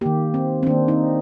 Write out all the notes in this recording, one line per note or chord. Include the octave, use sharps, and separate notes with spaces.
D#3 A#3 G4
C4
C4
D#3 A#3 D4
D#4